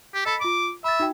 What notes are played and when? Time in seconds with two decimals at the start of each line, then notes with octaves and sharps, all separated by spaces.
0.14 G4
0.26 A4 D#5 B5 B6
0.41 F4 D6 D7
0.84 E5 B5 A6
1.00 D#4 F#4 G5